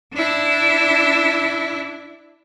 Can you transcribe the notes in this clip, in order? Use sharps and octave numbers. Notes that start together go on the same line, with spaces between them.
D4 E4